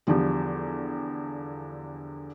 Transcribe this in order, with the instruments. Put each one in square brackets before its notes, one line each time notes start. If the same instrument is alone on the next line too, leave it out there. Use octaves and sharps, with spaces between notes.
[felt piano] E2 D3 F3 G3